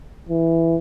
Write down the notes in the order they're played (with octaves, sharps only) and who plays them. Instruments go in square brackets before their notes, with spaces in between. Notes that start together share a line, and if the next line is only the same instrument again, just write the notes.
[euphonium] E3